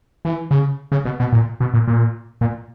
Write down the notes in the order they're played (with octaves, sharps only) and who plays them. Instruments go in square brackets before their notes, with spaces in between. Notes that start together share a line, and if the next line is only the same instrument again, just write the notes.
[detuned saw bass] E3
C#3
C#3
B2
B2
A#2
B2
A#2
A#2
A#2